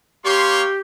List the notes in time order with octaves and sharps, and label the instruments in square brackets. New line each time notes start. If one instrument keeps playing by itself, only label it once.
[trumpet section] A#3 C#5 C6 [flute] G4